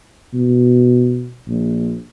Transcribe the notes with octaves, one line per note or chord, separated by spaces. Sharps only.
B2
A#1